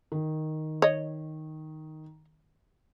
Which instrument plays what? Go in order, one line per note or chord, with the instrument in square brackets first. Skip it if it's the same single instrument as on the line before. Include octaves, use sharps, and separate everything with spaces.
[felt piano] D#3
[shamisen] C#5 D#5